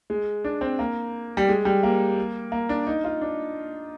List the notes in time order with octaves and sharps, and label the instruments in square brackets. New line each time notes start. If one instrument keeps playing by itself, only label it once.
[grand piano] G#3
D4
C4
A#3
G3
G#3
G3
A#3
A#3
D4
D#4
F4
D4